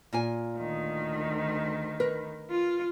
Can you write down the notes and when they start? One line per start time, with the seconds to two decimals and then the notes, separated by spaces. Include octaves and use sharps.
0.13 A#2 F4 G#5
0.57 D2 D#3
2.00 A#4 B4
2.50 F4